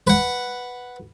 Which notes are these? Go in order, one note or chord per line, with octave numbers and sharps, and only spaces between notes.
B4 F#5